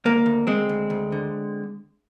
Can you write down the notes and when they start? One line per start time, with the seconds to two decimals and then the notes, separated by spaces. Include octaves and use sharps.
0.05 D2 A#3
0.26 D2
0.47 D2 G#3 C4
0.69 D2
0.90 D2
1.12 D3